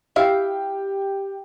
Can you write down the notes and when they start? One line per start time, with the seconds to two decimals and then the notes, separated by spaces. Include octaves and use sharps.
0.16 E4 G4 E5 F5